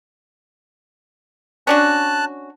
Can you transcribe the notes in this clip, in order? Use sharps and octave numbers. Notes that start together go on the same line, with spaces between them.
C#4 D4 F#4 A5 F#6